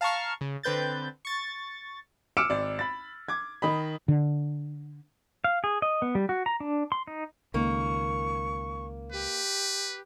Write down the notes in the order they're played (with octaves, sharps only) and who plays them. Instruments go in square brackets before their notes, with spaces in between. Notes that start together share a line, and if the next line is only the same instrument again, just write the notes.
[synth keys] F5 A5 A#5 C#6 F6
C#3
D3 C4 B4 G6 A6
C#6 A6
[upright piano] D6 E6 F6 C#7 D7 E7
G#1 D5
B5 A6
D6 G#6
D#3 D#5 B5
[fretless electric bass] D3
[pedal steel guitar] F5
G#4
D#5
B3
G3
F#4
A#5
D4
C6
D#4
[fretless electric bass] C#2 D#3 [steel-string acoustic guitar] A#3 [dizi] C#6
[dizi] G4 [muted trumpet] B4